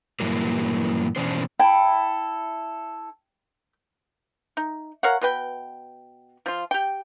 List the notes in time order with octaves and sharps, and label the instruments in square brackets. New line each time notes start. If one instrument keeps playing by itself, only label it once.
[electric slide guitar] G2 A#2 E3 F#3 A#3
B2 E3 C#4 D4 C5
[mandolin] E4 A4 [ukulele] G5
[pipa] D#4
A#4 C#5 F5 F#5
B2 B4 G5
F3 F4
G4 G5